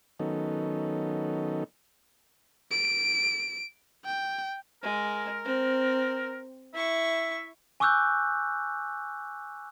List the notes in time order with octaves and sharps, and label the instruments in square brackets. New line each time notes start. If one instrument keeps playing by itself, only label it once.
[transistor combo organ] D#3 F#3 B3 C#4 D#4 A4
[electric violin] D7
G5
[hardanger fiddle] G#3 [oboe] A#4
[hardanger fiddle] C4
[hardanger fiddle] E4 C#6 [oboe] E5
[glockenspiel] G#5 C#6 D6 E6 F#6 G6